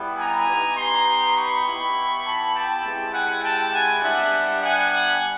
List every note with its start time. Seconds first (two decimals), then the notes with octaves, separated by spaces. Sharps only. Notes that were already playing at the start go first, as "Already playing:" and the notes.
Already playing: G3 B3 E4 G4
0.17 G#5 A#5
0.47 B3 D#4 G4
0.76 A#5 C6
1.36 B5 C#6
1.66 B3 E4 G4
2.24 A5 B5
2.54 G5 A5
2.83 G#3 C4 E4 G4
3.13 F#5 G#5
3.43 G5 A5
3.73 F#5 G#5
4.02 G3 B3 D4 G4 E5 F#5
4.62 F#5 G#5